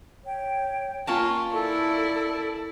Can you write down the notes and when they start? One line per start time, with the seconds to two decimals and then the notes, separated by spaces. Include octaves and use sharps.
0.24 C#5 G5
1.07 A#3 C#4 F4 A5 C#6
1.53 E4 A4 D5